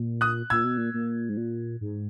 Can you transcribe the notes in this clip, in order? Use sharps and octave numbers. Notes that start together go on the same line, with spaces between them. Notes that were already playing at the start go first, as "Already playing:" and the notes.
Already playing: A#2
D#6 F#6
A#2 E6 G#6
B2
A#2
A#2
G#2
A#2
G#2